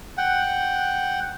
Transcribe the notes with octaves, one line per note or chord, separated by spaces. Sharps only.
F#5 G5